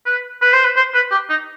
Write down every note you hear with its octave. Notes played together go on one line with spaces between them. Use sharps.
B4
B4
C5
B4
C5
B4
G4
D#4